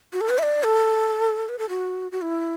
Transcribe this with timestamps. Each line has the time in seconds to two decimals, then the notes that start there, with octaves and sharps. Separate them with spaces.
0.13 F#4
0.21 A4
0.29 B4
0.38 E5
0.43 D5
0.63 A4
1.49 B4
1.59 A4
1.69 F#4
2.12 F#4
2.22 E4